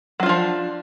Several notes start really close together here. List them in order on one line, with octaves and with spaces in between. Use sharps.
F#3 F4 D4 F3